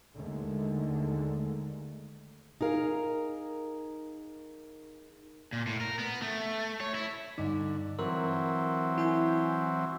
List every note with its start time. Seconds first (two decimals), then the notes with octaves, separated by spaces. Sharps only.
0.15 D#2 D3 D#3 G#3 A3
2.61 D#4 G#4 A#4 F5
5.53 A#2
5.67 A2
5.81 A#4
5.98 B3
6.22 A3
6.80 C#5
6.95 E4
7.38 G2 D3 D#4
7.99 E3 F#3 C4 A#4
8.98 E4 G#5 G6